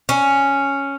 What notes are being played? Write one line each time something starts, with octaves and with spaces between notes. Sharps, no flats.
C#4